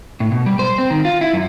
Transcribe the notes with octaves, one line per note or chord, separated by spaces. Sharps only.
A2
B2
G3
C5
C4
D#3
F4
E4
F#2